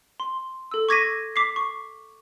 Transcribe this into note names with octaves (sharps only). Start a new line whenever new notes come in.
C6
A4 E6
C#6 D6 G#6 A#6 B6 D#7
D6 B6 C7
C#6